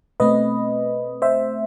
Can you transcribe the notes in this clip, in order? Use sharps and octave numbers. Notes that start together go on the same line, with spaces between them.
B2 A3 C4 B4 D#5
C5 E5